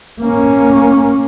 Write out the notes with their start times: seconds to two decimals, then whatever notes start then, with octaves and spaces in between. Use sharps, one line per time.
0.21 A#3 C#4